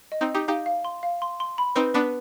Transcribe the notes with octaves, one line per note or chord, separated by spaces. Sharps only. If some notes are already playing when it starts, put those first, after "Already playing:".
D#5
C4 D#4
D#5
D#4 G4
D#4 G4 F5
F5
C6
F5
C6
C6
B5
C4 D#4 B4
B3 D4 B4